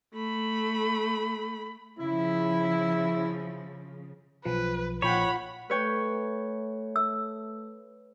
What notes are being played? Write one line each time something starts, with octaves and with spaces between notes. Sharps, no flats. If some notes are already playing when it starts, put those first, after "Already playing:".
A3 B5
C#3 F3 E4
B1 F3 B4
A#1 F3 F4 C#5 F#5 G5 B5
A3 B4 C#5 G5
E6